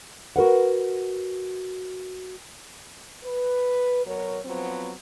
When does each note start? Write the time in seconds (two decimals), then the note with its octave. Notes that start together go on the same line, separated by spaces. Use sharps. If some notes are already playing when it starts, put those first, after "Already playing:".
0.36 F#4 A#4 B4 F#5
3.24 B4
4.06 B2 F#3 A#4 C#5
4.45 F3 F#3 B3 C4